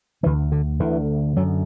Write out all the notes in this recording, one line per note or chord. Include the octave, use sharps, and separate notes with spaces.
D2 D3 E3
D3
D2 D3 E3
F#2 D3 F#3